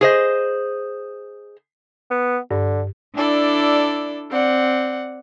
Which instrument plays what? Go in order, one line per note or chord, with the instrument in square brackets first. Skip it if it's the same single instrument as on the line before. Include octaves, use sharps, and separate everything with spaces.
[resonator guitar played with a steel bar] G#4 C5 D#5
[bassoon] B3
[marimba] G2 [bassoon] D3
[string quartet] D4 E4 A4 D5
C4 D5 F#5